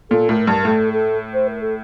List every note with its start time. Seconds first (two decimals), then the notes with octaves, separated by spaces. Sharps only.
0.10 A#2 A4
0.29 A2 A#4
0.47 G2 A#4
0.65 A2 A4
0.93 A4
1.33 C5
1.47 A#4
1.61 A4